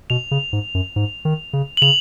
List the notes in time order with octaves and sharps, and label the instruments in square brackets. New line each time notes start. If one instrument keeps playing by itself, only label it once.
[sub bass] B2 [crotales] F7
[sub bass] C#3
G#2
F#2
G#2
D#3
C#3
[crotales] F#7
[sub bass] C#3 [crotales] F7